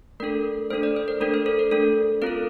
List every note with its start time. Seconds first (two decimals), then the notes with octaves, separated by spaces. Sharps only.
0.20 A3 D4 A4 A#4
0.70 A3 D4 A4 C5
0.83 D5
0.96 C5
1.08 A#4
1.20 A3 D4 A4 A#4
1.34 C5
1.46 A4
1.59 A#4
1.71 A3 D4 A4
2.22 C4 F4 A4 A#4